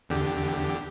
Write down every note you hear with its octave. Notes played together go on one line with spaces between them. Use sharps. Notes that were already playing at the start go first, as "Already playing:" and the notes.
E2 D3 G4